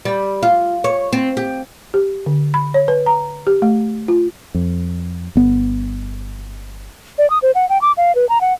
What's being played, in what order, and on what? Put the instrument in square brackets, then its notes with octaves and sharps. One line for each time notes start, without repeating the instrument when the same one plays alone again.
[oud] G3
F4
C#5
C4
G4
[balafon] G4
D3
B5
C#5
B4
A#5
G4
A3
F4
[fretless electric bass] F2
G1 B3
[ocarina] D5
D#6
C5
F#5
G5
D6
F5
B4
A#5
F#5